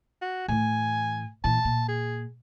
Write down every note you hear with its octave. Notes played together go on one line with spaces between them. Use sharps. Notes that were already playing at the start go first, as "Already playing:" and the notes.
F#4
A2 E3 G#5
A#2 E3 A5
A#2
G#4